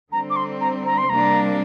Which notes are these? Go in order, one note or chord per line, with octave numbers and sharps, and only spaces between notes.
D3 G3 C4 A#5
D6
C6
A#5
A#5
C6
C3 G3 A#3 D4 A#5